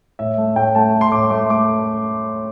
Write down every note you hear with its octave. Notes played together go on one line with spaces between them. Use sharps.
A2 E5
A3
A2 G5
A3 A5
A3
C6
A2 D6
A3 D6
A3 D6